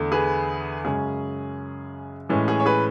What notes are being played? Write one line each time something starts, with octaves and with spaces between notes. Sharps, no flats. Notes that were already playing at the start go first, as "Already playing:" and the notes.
Already playing: E2 D3 A3
G#4 B4
F#2 C#3 G#3 C#4 G#4
A2 E3 G#3 C#4
G#4
C#5
G#4 B4